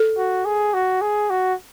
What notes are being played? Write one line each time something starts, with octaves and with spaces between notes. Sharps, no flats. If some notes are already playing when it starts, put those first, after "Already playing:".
Already playing: A4
F#4
G#4
F#4
G#4
F#4